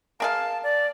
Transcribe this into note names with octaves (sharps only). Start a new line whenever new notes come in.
A#3 G#4 F5 A5
D5